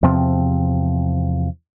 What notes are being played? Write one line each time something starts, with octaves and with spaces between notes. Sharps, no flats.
E2 C3 F3 C4